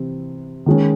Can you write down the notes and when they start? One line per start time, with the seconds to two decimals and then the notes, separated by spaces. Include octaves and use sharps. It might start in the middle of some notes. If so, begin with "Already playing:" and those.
Already playing: C3 E3 C4
0.66 D#3 G#3 C#4